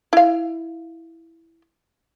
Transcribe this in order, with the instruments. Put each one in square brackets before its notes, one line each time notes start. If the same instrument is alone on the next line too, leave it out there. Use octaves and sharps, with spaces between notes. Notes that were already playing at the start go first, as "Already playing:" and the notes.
[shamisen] E4 F5